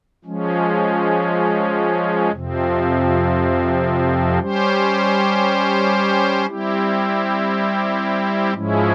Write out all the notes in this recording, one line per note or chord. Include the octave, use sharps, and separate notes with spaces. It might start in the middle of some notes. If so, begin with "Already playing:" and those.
F3 G#3 C#4
F2 C3 F3 C4
G3 C#4 G4 C5
G3 C4 E4 G4
G#2 F3 G#3 C#4 E4